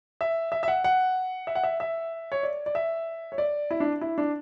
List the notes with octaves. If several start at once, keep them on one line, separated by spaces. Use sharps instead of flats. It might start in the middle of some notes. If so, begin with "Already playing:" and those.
E5
E5
E5
F#5
F#5
E5
F#5
E5
E5
C#5
D5
D5
E5
C#5
D5
E4
D4
E4
D4